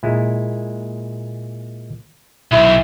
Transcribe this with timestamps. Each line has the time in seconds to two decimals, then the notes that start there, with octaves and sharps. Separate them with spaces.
0.03 A#2 G#3 E4
2.52 B1 E4